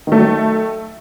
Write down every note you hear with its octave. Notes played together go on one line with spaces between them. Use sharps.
D#3 F#3 A3